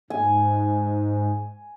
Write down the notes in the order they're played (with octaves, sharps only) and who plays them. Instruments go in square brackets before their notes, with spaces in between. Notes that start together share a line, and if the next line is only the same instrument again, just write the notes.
[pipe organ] G#2 [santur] G#5